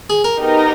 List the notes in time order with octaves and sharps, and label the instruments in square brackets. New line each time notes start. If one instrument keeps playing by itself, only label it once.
[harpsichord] G#4
A#4
[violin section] B3 D#4 G4 A#4 D#5